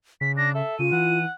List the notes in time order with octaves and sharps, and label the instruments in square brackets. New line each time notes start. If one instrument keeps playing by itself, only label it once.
[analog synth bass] C#3 [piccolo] B6
[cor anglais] D4 [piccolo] A#6
[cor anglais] A4 [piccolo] E5
[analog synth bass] C#3 [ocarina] F4 [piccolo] D#7
[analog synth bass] E3 [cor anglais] F#5